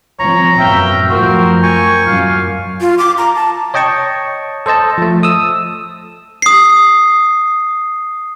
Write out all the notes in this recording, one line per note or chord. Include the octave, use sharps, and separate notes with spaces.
F3 C4 C#5 A#5
F#2 A2 B3 E5 F5 G5
F#2 F3 A3 C4 F#4 A#4
G5 G#5 C#6
F#2 D#3 A#3 F4 F5
F4
D6
A#5
A5
C#5 D#5 G5 A5 C#6
A4 C5 D#5 A5
F3 A3
D#6 E6
D#6 C7